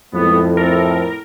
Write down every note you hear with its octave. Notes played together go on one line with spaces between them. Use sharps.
F2 A2 G#3 B3
C4 A4 A#4